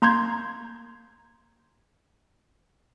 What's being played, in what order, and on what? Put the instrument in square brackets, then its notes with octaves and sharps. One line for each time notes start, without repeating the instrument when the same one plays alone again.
[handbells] A#3 A#5 C6 G6 G#6